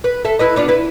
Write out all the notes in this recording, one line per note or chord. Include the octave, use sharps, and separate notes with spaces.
B4
A4 E5
E4 B4 D#5
B3 D4 F4
E4 B4